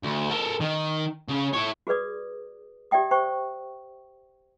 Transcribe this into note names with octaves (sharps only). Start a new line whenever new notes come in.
D2
A4 A#4
D#3
C#3
E4 C#5
F#4 G#4 B4 D5 D#6
G4 D5 E5 G5 D#6
C5 G5 C#6